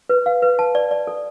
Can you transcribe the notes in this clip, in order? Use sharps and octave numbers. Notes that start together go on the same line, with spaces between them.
B4
F5
B4
A5
D5
D5
A4